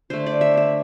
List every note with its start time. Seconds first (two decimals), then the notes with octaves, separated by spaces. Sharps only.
0.10 D3 A3 C5
0.26 D5
0.41 E5
0.57 E5